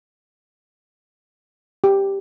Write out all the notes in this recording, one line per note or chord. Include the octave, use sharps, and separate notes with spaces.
G4